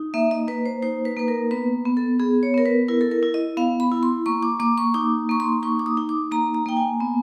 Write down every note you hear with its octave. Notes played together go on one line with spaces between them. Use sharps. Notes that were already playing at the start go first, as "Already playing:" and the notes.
Already playing: D#4
A#3 E5
D#5
A#3 B4
C5
D#4 C5
B4
A#3 B4
A#4
B3 B4
B3
A4
B3 G#4
C#5
B3 A#4
B4
E4 A#4
A4
A#4
E4
D#5
B3 F5
B5
E4
C6
A#3 C#6
D6
A#3 D6
C#6
D#4 D6
A#3 C#6
C6
D#4 C#6
D6
D#6
D#4
D6
A#3 A#5
A#5
A#3 G5
G#5
B3